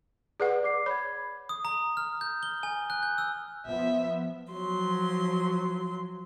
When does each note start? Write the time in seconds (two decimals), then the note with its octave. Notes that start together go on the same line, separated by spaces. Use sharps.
0.40 G#4 B4 D5 F#5
0.63 D5 D6 C7
0.86 C#5 B5 G#6
1.49 D#6
1.65 A#5
1.97 F6
2.21 G6
2.43 G7
2.63 G#5
2.90 F#6
3.03 G6
3.18 E6
3.66 F3 B3 E5
4.53 F3 F#3 C6